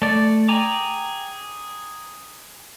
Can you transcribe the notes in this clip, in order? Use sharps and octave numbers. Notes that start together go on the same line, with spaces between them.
A3 D5
G#4 G5 G#5 A#5 D6